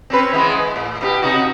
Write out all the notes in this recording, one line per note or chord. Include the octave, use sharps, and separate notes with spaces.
C4 C#4 B4
E3 G#3 B3
G#3
A2
B2 D#4 G4
C3 D#4 F#4